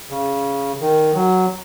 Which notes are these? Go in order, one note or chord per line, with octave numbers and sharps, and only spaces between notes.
C#3
D#3
F#3